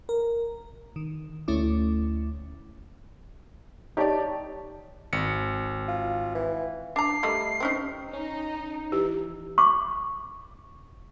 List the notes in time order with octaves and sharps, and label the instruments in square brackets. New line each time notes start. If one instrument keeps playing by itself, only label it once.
[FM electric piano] A#4
D#3
D2 A3 C#4 E4 D6
[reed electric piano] D#4 C#5 A5 [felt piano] G4 D5
[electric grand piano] G#1 C#7
[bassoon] F4
E3
[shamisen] D4 A#5 [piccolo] C7
[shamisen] G3 A3 D#5
C4 C#4 D#4
[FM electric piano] C#4 [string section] D#4
[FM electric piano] E3 [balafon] G4
[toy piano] C#6 D6